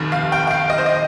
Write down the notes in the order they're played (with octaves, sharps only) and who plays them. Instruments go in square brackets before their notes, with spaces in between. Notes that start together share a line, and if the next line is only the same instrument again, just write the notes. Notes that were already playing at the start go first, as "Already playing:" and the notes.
Already playing: [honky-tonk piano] F1 D#2 D#3
F5
G5
G5
F5
D#5
C5
D#5